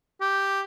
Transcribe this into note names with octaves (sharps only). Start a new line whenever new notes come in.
G4